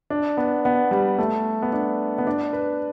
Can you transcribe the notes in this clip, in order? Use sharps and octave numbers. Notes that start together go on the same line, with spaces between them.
D4
B3
B3
G3
A3
B3
D4
B3
D4
B4